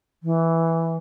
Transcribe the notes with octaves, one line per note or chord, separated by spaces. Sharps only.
E3